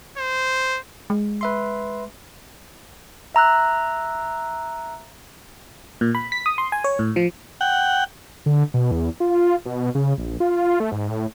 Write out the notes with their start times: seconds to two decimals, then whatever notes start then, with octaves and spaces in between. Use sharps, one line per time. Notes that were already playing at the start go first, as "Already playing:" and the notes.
0.18 C5
1.10 G#3
1.41 B4 E5 C6
3.35 E5 A#5 E6 F#6
6.01 A#2
6.15 B5
6.32 B6
6.46 D#6
6.58 C6
6.72 G#5
6.84 C#5
6.99 A2
7.16 F3
7.61 F#5 G5
8.46 D3
8.74 B2
8.91 E2
9.20 F4
9.65 B2
9.95 C#3
10.18 A#1
10.40 F4
10.80 A3
10.92 G#2
11.09 A2